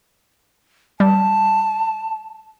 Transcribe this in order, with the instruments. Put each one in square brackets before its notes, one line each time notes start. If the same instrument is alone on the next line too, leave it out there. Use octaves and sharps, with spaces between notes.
[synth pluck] G3 [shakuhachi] A5